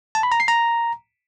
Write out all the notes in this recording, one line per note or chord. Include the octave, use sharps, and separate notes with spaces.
A5
B5
A#5
C7
A#5